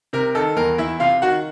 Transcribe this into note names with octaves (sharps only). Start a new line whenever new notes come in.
C3 A#4
D#3 A4
E2 A#4
E2 E4 E5
C3 F4 F5
D#3 F#4 F#5